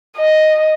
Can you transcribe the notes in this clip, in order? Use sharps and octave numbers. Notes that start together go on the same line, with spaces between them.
D#5